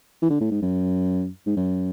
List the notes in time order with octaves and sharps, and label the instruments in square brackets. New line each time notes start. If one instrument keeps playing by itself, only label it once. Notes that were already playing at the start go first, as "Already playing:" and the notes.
[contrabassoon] E3
D3
A2
G#2
F#2
G#2
F#2